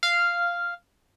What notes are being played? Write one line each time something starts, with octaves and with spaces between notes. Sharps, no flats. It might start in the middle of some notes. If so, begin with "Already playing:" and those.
F5